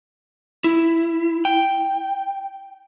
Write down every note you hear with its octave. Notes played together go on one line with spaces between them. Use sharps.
E4
G5